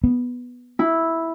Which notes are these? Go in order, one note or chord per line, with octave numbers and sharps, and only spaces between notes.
B3
E4